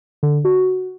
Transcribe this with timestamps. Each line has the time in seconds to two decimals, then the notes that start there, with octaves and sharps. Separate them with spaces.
0.23 D3
0.44 F#4